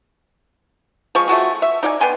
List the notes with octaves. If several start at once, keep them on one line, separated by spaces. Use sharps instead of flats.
F3 G#3 C#6
A3 F4 F#4 G#4
E5
D#4 D5 F5 G#5
B3 G5 G#5 C6